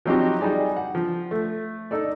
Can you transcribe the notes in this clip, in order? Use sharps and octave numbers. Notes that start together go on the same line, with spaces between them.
F3 F#3 C4 D#4 F#4 G4
G3 D#4 G#4 D5
F#5
F3
A3
D#4 A4 D5